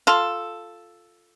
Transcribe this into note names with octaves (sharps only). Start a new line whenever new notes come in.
F4 A4